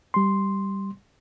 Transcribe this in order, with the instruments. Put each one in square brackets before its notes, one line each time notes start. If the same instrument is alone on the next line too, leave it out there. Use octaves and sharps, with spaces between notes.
[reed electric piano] G3 C6